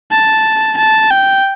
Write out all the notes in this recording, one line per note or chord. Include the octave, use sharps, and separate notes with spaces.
A5
A5
G5